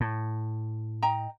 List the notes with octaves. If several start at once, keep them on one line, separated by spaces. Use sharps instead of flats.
A2
D#5 G5 A#5